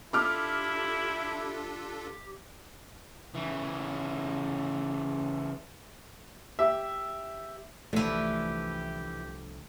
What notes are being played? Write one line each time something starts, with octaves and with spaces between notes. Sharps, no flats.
D4 E4 F4 G4 A4 D6 F6
C#3 E3
G4 E5
C2 D3 E3 F3 A3 D4 G4